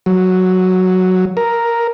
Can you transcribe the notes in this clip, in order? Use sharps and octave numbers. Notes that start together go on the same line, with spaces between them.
F#3
A#4